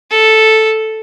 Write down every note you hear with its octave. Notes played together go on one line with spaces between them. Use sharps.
A4